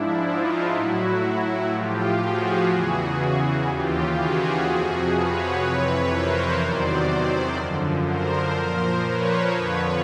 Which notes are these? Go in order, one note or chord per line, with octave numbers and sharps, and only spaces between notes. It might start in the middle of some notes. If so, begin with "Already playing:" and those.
Already playing: G#2 F3 D4 E4
D#4 F4
A2 F#3 E4 F#4
A2 F3 F4 G4
F#4 G#4
E2 C#3 E3
D#2 C#3 E3 F4 G4
F#4 G#4
F2 C3 F3
B4 C#5
F2 C3 E3 B4 C#5
A#4 C5
E2 C3 D#3 F#3 C5 D5
F#2 D3 F3
A#4 C5
A#2 F3
B4 C#5
F2 D3 F3 B4 C#5